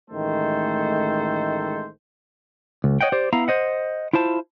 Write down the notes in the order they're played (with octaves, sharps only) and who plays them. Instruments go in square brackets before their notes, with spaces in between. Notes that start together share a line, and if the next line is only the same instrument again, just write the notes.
[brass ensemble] A1 D#3 G#3 A3 A4 C5
[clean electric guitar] C#2
C#5 D#5 F#5 G5
G4 C5 D5
B3 E4 F5 A#5
C5 D#5 F#5
E4 F4 C5 A5